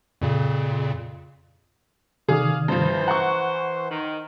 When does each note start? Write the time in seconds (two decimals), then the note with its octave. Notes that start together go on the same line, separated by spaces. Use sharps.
0.22 F2 A#2 C#3
2.29 C3 D#3 G#4 D5 F5 D#6
2.68 G2 E3 F3 C5
3.08 F#5 A#5 C#6
3.90 D#3